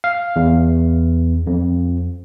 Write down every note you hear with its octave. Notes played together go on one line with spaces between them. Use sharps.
F5
E2
F2